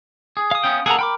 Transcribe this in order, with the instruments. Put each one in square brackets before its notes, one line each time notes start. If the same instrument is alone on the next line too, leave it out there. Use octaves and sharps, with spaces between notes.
[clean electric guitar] G#4
[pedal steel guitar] F5 D#6
[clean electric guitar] B3 C#4 G5
[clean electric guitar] A#3 A4 F#5 [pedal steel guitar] G#4 A#5
[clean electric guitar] A#4 [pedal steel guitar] G5 B5 D6